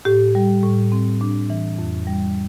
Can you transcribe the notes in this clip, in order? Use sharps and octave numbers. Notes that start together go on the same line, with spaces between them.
A2 G4
G3
A2
C4
D4
E3
F2
G3